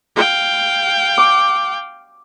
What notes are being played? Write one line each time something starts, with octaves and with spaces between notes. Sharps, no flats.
F5 G5
D6